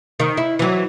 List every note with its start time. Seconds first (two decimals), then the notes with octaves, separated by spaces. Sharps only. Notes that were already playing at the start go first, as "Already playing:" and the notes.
0.20 D#3
0.37 E4
0.59 E3 F#3